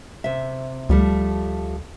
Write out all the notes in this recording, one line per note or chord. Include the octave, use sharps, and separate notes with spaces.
C3 E5
D2 F3 G3 A3